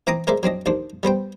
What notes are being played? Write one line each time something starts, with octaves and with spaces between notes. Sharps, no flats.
E3 C4 A#5 D6 D#6
G#3 A#4 C5 D5 E5
F#3 C4 D4 D#5
D#2 D4 C5
G3 B3 C5 G5